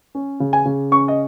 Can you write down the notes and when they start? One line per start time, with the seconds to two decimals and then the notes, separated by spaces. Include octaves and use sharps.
0.15 C#4
0.40 C#3
0.53 G#5
0.65 C#3
0.91 C#4 C#6
1.08 D#5